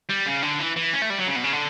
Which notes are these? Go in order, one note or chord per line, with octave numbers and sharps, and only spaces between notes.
G3
C#3
D3
E3
E3
C#4
A3
G3
F#3
C#3
B2
C#3
D3